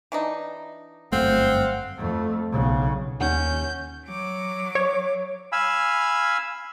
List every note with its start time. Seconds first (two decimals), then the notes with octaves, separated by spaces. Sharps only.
0.12 E3 D4 D#4
1.12 G1 F#2 A3 C4 F5 F#5
1.98 F2 A3
2.52 B1 C#3
3.21 D#2 C#4 F#5 G6
4.06 F#3 D6
4.75 C#5
5.52 F5 G#5 B5 E6